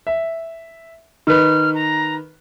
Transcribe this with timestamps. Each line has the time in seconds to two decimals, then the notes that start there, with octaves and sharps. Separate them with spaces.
0.07 E5
1.27 D#3 B4 F6
1.74 A#5